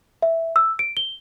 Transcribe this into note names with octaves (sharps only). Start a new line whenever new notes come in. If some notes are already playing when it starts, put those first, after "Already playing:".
E5
E6
D7
G7